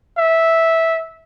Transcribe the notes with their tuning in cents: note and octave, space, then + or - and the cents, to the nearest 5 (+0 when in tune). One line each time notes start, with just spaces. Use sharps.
E5 -10